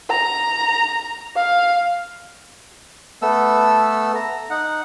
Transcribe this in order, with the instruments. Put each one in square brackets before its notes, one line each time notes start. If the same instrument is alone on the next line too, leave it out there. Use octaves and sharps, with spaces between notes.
[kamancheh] A#5
F5
[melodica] A3 B3 A4 E6
A#5
D#4 F#5